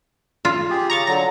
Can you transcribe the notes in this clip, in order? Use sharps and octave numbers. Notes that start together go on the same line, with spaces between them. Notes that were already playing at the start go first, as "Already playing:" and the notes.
F4
G4 G#4
C#3 A#5 C#6 A6
D3 F#3 A#5